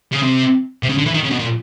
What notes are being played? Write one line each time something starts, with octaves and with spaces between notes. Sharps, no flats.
C#3
C3
C3
C#3
D3
E3
D#3
C#3
B2
A#2